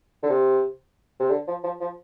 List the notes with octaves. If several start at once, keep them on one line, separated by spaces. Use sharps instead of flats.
D3
C3
C3
D3
F3
F3
F3